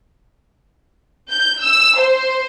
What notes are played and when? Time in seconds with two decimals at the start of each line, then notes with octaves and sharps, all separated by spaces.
1.31 G6
1.62 E6
1.99 C5